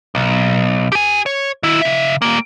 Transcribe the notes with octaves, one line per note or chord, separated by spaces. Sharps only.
B1
G4 G#5
C#5
D#3 E4
C#3 E5
G3 A#3